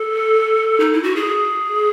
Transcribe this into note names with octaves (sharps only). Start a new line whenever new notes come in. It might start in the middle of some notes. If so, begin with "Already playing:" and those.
Already playing: A4
D#4
E4
F#4
G#4